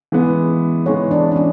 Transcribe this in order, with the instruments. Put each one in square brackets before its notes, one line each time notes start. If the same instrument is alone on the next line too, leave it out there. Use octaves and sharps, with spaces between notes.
[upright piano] E3 G#3 B3
[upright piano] E3 G#3 B3 [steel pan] C#5
[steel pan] D4
D4
C#4